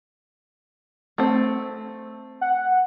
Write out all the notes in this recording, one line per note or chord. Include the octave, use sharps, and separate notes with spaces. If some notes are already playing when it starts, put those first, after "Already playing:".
A3 C4
F#5